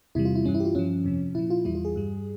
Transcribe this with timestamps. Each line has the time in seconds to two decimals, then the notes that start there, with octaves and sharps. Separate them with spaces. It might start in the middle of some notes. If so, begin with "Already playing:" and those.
0.15 E2 C3 E3 G3 E4
0.25 F4
0.35 E4
0.44 G2 E3 G3 C#4
0.54 E4
0.60 G4
0.65 F4
0.75 G2 F3 C#4
1.05 F2 C3 F3
1.35 A#2 F3 E4
1.50 F4
1.65 E2 E3 G3 E4
1.75 F4
1.85 G#4
1.96 G2 G3